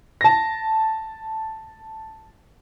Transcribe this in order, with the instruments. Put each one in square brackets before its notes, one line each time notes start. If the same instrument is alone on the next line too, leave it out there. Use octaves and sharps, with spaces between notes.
[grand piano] A5 A#6